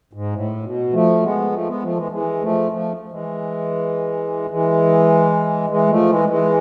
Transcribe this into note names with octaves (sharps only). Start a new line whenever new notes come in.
G#2
A2
B2
F3 A3
G#3 B3
F3 A3
G#3 B3
F3 A3
E3 G#3
E3 G#3
F3 A3
F3 A3
E3 G#3
E3 G#3
E3 G#3
F3 A3
E3 G#3
E3 G#3